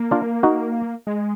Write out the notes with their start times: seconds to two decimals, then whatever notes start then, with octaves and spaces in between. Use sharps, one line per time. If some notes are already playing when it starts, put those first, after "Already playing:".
Already playing: A#3
0.11 D4 F4
0.43 D#4 F#4
1.07 G#3